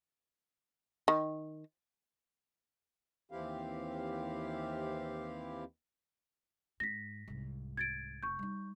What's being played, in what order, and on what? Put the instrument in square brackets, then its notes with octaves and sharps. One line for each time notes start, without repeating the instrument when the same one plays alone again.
[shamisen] D#3
[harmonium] D#2 E3 C4 E4 G4 F5
[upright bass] G#2 [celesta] A#6 B6
[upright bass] C2 G#2
[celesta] G#6 A6 D7
[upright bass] F1 [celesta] C#6 G6
[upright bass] G3 D#4